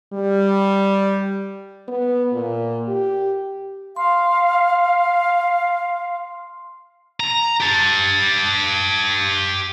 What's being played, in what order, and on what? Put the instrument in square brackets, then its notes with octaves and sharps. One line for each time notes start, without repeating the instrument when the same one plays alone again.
[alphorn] G3
B3
A#2
G4
[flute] F5 [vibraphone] C6
[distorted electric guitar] A#5
G4 A5